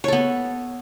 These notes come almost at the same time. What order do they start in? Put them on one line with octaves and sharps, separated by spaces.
C#5 A4 B3